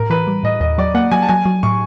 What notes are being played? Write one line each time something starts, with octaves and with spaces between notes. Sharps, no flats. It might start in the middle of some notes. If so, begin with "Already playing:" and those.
Already playing: A2 A#4
E3 B4
G3
A2 D#5
D#2 D#5
F#3 D5
A#3 F#5
F#3 G#5
A5
F#3 G#5
F#3
A2 C#6